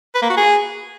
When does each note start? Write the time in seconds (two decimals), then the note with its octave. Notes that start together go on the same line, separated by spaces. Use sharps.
0.15 B4
0.22 A#3
0.29 F#4
0.37 G#4